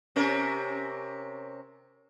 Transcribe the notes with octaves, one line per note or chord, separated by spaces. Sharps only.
C3 C#4 A#4